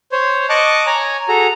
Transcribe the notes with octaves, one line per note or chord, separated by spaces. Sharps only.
C5 C#5
D#5 A5 C#6 D6 F#6
C#5 G#5 A#5
F#4 G#4 A4 A#5